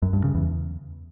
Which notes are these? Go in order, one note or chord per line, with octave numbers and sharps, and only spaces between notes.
F#2
G2
C#3
E2